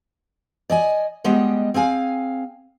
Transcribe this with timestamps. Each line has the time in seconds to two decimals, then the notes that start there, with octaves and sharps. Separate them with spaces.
0.70 D5 D#5 G#5
1.24 G3 G#3 B3 G4 D#5
1.74 C4 G#4 F5 G#5